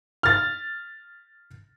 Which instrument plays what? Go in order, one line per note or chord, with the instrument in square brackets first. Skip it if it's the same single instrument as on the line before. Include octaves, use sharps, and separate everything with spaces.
[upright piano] F6 A6